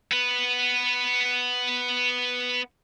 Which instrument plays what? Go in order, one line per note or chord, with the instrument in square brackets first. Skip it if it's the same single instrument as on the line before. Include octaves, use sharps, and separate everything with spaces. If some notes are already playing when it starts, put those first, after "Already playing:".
[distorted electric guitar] B3 B4